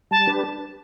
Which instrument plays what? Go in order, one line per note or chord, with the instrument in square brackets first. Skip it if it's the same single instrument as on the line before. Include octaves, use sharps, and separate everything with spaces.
[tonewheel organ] G3 [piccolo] A5
[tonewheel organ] D4 G4 B4